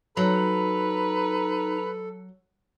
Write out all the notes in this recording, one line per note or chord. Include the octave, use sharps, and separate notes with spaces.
F#3 D#4 A4 B4 A#5